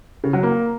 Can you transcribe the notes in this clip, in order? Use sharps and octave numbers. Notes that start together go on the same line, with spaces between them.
C#3
F#3
A#3